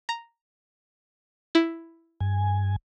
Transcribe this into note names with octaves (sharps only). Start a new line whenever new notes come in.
A#5
E4
G2 G#5